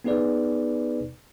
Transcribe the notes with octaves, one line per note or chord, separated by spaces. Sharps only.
B3 D#4 G#4 B4 D5